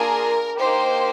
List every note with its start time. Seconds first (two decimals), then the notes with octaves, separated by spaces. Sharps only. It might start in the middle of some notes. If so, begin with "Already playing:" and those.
Already playing: A#3 D4 F4 G#4 A#4
0.58 A#3 D#4 G4 C5